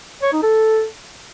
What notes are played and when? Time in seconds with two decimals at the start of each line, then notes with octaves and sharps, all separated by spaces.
0.23 C#5
0.33 D#4
0.43 A4